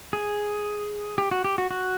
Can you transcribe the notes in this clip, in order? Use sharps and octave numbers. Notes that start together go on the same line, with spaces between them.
G#4
G4
F#4
G4
F#4
F#4